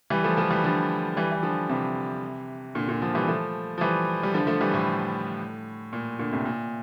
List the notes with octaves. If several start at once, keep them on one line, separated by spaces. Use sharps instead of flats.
E3 G3
F3 A3
F3 A3
E3 G3
D3 F3
E3 G3
E3
D3 F3
C3 E3
A#2 D3
A#2 D3
D3 F3
E3 G3
F3 A3
F3
E3 G3
G3
D3 F3
F3 A3
E3 G3
A2
A#2
A#2 D3
A2 C3
A#2